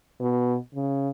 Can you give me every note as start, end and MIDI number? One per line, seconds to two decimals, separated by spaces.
0.20 0.56 47
0.75 1.09 49